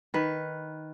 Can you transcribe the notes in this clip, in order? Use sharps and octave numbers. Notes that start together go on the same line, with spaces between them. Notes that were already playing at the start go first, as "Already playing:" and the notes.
D#3 B4